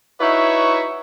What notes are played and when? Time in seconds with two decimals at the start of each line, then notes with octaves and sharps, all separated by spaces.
0.20 D#4 E4 F#4 B4 C#5 E5